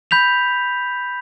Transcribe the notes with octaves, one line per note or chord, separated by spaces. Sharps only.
B5 G6 B6 F7